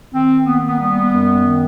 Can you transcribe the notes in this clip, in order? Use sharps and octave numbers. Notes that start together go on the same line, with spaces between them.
D#3 C4
A#3 B3
B3
G3 B3
F#2
D#3